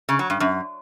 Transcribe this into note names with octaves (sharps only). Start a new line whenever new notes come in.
C#3
F#3
G2
F#2